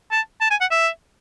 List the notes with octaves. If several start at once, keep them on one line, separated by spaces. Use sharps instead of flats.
A5
A5
G#5
F#5
E5